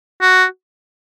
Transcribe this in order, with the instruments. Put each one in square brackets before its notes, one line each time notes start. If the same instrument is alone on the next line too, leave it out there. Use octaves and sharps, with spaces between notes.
[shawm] F#4